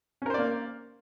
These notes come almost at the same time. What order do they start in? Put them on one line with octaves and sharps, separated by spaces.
C#4 A#4 C5 D5 A#3